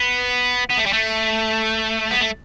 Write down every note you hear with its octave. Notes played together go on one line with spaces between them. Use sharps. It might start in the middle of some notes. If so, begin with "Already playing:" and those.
Already playing: B3
B3
A3
G3
A3
B3
A3